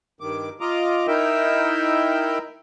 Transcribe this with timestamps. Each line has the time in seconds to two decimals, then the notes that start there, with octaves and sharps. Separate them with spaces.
0.21 G2 D#3 D6
0.61 F4 D#5 A#5 D6
1.07 D#4 E4 A#4 E5 G5